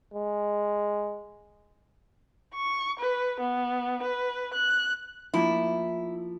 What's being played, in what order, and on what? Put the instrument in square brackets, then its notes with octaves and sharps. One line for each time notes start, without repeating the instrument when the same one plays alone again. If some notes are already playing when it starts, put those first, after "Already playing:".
[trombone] G#3
[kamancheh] C#6
B4
B3
B4
F#6
[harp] F3 A#3 [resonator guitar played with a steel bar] E4